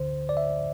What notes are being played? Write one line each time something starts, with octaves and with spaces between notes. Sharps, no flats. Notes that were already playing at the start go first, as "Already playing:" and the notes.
Already playing: D2 D3 C5
D5
E5